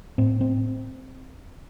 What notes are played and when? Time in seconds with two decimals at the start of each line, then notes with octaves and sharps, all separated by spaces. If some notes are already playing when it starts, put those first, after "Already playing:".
0.18 A2 C4
0.41 C4